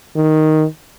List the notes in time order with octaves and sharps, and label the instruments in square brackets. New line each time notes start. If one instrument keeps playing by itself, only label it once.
[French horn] D#3